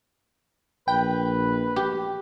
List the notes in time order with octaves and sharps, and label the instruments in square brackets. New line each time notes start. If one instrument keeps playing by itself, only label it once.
[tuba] A#1 [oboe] B4 [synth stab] G5
[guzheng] G4